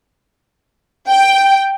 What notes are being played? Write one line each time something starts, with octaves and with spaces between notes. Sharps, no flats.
G5